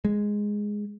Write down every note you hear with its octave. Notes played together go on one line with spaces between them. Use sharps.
G#3